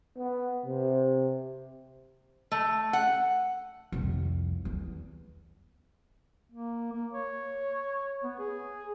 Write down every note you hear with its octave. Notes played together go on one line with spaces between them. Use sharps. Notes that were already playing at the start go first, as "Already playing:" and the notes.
B3
C3
A3
F#5
C2 F2
E2
A#3
A#3
C#5
B3
G#4